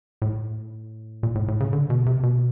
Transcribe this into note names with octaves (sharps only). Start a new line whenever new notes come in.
A2
A#2
A2
A2
C#3
D3
B2
C3
B2